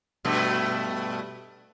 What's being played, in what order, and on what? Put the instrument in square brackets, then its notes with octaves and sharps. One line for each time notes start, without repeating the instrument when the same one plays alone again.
[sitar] G2 B2 A3